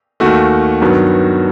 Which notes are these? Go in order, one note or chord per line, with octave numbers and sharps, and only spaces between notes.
D#2 D#3 A3 F#4
G2 D#3 F#3 B3